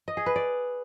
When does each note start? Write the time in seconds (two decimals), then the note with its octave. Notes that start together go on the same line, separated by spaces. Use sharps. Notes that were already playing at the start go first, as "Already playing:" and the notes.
0.08 D#5
0.17 G#4
0.26 B4
0.36 D5